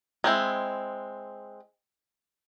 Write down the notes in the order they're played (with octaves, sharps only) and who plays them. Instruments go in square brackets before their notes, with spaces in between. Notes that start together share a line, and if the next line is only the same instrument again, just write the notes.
[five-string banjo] G#3 C4 E4